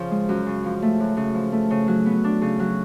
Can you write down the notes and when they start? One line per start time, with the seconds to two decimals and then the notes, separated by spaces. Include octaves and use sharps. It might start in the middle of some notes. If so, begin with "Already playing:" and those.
Already playing: C#3 F3
0.11 G#3
0.29 F#2
0.46 C#3
0.64 F3
0.82 A3
1.00 F#2
1.17 C#3
1.35 F3
1.52 A3
1.70 C#3
1.88 F#3
2.06 B3
2.24 D4
2.42 C#3
2.59 F#3